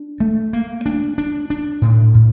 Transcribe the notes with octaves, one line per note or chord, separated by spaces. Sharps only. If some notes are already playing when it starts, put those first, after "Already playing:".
Already playing: D4
A3
A#3
D4
D4
D4
A2
A2